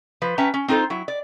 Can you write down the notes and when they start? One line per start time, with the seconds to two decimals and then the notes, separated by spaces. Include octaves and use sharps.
0.22 F3 B4
0.38 C#4 B4 E5 G5 A5 A#5
0.54 C#4
0.68 C4 D#4 F4 A4 C5
0.90 F#3 E4
1.08 D5